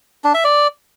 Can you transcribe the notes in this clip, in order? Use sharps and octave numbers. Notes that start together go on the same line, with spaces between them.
D4
E5
D5